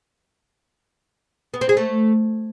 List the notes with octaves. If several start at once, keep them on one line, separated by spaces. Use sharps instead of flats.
B3
C4
G#4
A3